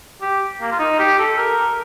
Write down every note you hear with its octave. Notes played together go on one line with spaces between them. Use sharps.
G4
A#3
F4
D#4
G4
A4
A#4